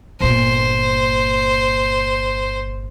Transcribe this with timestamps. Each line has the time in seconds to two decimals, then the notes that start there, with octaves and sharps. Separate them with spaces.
0.21 G1 A#2 C5